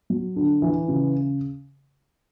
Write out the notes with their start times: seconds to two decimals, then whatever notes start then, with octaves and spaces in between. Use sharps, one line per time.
0.10 F#3
0.36 D3
0.62 E3
0.88 C#3